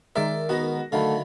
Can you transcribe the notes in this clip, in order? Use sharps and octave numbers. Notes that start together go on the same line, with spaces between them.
D#3 G#3 A#4 C5 D5 E5 D6
B3 D#4 F#4 A#6
D3 D#3 F#3 A3 F5 B5